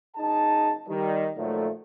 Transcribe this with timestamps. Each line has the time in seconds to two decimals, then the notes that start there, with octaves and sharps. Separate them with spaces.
0.17 F#1 D#4 G#4 A5
0.88 D#3 G3
1.37 A#2 D#3 F3 F#3 A3